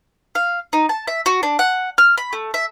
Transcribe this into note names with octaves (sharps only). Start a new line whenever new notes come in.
F5
D#4
A5
E5
F#4
D4
F#5
F6
B5
A3
E5